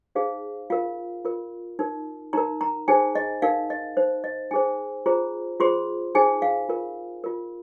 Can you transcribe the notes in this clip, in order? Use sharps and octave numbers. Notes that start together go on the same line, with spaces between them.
D#4 G#4 C5 F5
F4 A#4 F5
F4 A#4
D#4 A#4
D#4 A#4 A#5
A#5
D#4 G#4 C5 G#5
D#5
D#4 A#4 F5
D#5
D#4 C5
D#5
D#4 G#4 C5 G#5
F4 G#4 C5 A#5
F4 G#4 C5 C6
D#4 G#4 C5 G#5
F5
F4 A#4
F4 A#4